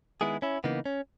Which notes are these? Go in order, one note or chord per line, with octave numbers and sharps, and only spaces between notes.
D#3 G#3 B3 E4 G#4
C#4 E4
C#3 E3 A#3 B3 D#4
C#4